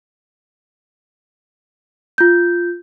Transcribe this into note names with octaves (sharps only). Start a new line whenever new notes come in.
F4 G6